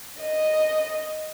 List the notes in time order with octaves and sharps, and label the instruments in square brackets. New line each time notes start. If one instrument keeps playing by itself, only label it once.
[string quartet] D#5